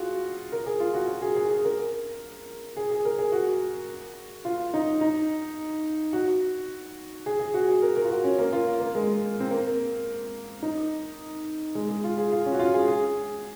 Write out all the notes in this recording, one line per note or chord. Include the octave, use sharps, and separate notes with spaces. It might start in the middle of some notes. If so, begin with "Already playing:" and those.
Already playing: F4 F#4 G#4
A#4
G#4
F4
F#4
F#4
G#4
G#4
G#4
A#4
G#4
G#4
A#4
G#4
F#4
F4
D#4
D#4
F#4
G#4
G#4
F#4
G#4
A#4
A#4
F4
F#4
C#4
A#3
F4
A#3
G#3
C4
A#3
D#4
G#3
G#3
F4
G#4
F4
C#4
F#4
F4
G#4
G#4